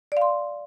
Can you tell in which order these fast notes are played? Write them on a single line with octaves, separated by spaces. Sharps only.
D5 F5 C6